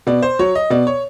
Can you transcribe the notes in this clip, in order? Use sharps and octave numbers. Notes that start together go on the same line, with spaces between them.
B2 D5
C5
F#3 C#5
D#5
B2 D5
C#5